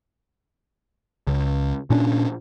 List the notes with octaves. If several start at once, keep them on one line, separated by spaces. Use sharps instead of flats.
C#2
A#2 C#4 D4